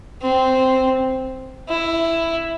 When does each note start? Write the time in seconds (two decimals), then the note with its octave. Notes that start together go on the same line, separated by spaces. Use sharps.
0.22 C4
1.69 E4